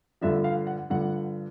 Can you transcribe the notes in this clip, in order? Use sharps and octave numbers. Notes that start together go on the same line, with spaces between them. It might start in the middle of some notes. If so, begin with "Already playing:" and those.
G2 D3 F3 E5
F5
F#5
G2 D3 F3 F#5